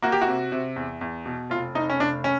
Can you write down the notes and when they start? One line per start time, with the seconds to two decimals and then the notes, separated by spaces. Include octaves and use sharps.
0.02 A#3 F#4
0.12 G4
0.21 F#4
0.28 C3
0.52 C3
0.76 E2
1.01 E2
1.26 B2
1.50 F1 F4
1.75 F1 D#4
1.90 C#4
2.00 F1 D4
2.24 C#4